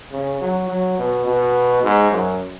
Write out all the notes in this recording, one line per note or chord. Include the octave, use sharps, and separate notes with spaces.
C#3
F#3
F#3
B2
B2
G#2
F#2